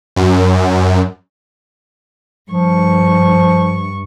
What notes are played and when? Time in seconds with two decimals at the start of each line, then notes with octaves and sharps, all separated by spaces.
0.16 F#2
2.51 G2 F3 C#6